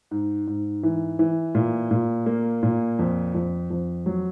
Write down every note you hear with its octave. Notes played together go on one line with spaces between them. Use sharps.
G#2
G#2
E3
E3
A#2
A#2
A#3
A#2
F2
F2
F2
F#3